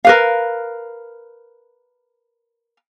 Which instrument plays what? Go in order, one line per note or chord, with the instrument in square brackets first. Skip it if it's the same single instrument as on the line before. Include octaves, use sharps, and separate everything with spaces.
[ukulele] A#4 B4 F5